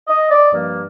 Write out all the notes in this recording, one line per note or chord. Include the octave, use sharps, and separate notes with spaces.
D#5
D5
G2 F3 A#3